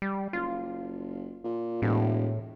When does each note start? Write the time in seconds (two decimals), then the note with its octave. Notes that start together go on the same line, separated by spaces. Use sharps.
0.02 G3
0.33 F#1 F4
1.44 A#2
1.82 E1 A2